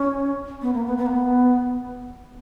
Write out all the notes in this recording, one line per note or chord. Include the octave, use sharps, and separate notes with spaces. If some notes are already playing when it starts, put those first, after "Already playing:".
Already playing: C#4
B3
A#3
B3
B3
A#3
B3